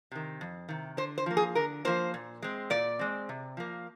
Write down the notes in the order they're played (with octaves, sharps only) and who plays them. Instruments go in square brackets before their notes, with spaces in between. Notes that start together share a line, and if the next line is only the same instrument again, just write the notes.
[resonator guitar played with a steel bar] C3 D#3
F2
C3 D#3
D3 C5
C5
F3 A#3
G#4
D3 A#4
F3 A#3 C5
A#2
G#3 C4
A#2 D5
G#3 C4
C3
F3 A#3